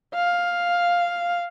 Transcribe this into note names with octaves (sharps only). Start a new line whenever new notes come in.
F5